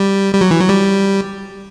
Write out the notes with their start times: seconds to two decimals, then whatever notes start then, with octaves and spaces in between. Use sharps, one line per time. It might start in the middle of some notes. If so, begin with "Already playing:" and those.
Already playing: G3
0.34 G3
0.41 F#3
0.51 E3
0.61 F#3
0.69 G3